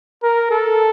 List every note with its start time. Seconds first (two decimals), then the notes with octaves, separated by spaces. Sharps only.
0.23 A#4
0.51 A4